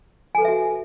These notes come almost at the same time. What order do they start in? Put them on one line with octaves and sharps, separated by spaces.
G#5 A4 B4 E5 F#4